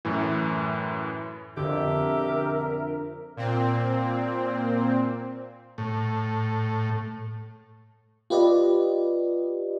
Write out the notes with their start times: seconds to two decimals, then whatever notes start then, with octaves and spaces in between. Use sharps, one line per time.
0.05 F#2 A2 E3
1.57 F2 B2 D3 G4 A#4 E5
3.37 A#2 C4
5.78 A2
8.30 F4 G4 B4 D5 D#5